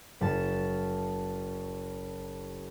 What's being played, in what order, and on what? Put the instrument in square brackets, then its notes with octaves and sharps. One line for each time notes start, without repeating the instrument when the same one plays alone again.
[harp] F#1 A5